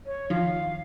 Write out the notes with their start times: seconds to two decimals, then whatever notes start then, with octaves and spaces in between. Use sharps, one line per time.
0.06 C#5
0.30 D#3 F3 F5